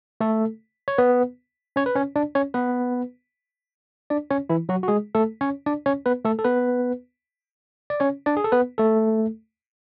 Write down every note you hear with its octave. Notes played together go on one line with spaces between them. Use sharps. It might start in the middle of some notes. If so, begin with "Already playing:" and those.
A3 A4
C#5
B3 B4
C#4 C#5
B4
C#4 C#5
D4 D5
C#4 C#5
B3 B4
D4 D5
C#4 C#5
E3 E4
F#3 F#4
F#4
G#3 G#4
A3 A4
C#4 C#5
D4 D5
C#4 C#5
B3 B4
A3 A4
A4
B3 B4
D5
C#4 C#5
D4 D5
G#4
A4
B3 B4
A3 A4